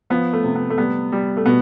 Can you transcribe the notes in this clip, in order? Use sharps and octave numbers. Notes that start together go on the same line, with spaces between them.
F3 B3
A3
C3
B3
A3
G3 B3
G3
A3
B2 B3